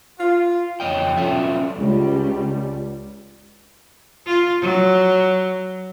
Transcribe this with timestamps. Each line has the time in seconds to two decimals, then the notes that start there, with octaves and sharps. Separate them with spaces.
0.19 F4
0.80 F2 C#5 D#5 G5
1.17 C#4 F4 A4 E5
1.78 C#2 G3
4.26 F4
4.61 F#3